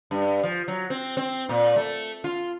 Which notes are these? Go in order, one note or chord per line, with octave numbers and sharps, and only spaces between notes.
G2
F3
F#3
C4
C4
A#2
A3
F4